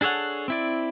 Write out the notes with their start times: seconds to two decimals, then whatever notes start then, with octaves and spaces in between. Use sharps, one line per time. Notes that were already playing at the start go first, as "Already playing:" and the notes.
0.01 D4 G#4 A4 C#5 F#5
0.48 C4 E4 D5